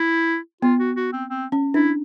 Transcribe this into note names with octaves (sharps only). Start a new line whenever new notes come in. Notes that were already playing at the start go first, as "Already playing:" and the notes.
Already playing: E4
B3 F4
F#4
F#4
C4
C4
C#4
D4 E4